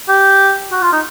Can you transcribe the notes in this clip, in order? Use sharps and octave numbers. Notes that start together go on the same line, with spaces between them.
G4
F#4
F4
D#4